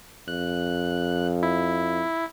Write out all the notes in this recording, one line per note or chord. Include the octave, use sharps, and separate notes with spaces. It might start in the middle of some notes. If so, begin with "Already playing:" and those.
F2 F#6
E4